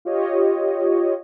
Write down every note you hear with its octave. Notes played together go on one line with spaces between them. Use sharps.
F4 G4 C#5 D#5